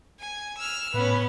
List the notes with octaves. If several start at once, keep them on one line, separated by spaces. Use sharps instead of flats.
G#5
E6 F6
A2 B3 C#4 B4